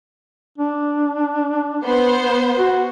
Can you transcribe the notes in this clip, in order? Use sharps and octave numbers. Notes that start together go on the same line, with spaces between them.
D4
B3 C5
F#4